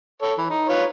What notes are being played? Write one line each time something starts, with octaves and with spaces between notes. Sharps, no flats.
A4 C#5
E3
D#4
F4 B4 C#5